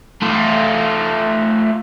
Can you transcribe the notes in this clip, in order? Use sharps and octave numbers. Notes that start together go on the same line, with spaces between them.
A3 F4